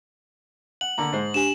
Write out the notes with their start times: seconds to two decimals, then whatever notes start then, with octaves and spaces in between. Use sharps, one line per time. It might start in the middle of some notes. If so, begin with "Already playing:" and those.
0.81 F#5 F#7
0.98 D3 A#3 A#5
1.12 G#2 G#3 C5
1.34 D4 G4 G#5 E7